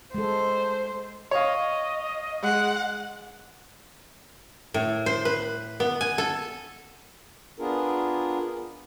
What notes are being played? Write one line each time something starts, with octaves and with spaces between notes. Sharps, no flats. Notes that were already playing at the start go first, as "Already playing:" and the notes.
G#3 A4 C5
C#5 D#5 F5
G#3 F#5
A2
C5
B4
B3
G#5
A4
B3 D4 F4 G#4 A#4